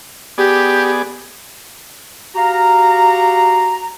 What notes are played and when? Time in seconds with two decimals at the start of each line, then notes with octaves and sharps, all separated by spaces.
0.38 B3 G4 G#4 D5
2.35 F#4 G4 F5 A#5